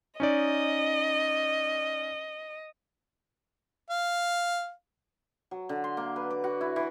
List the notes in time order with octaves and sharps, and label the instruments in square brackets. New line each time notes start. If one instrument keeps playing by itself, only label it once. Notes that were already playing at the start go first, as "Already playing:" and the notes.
[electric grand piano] C#4 D#4 D5 [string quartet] D#5
[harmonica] F5
[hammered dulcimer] F#3
D3
C6
A#3
B4
D6
F#4
E4
E3